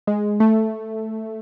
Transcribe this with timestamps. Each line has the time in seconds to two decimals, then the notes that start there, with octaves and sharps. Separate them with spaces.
0.07 G#3
0.40 A3